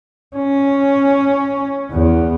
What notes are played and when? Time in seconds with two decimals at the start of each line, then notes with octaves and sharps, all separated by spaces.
0.36 C#4
1.91 E2